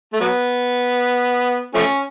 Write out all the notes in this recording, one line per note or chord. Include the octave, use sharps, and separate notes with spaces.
A3
F#3 B3
F3 A3 C#4